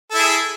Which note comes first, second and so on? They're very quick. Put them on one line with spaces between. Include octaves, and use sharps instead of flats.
A4 E4 G#4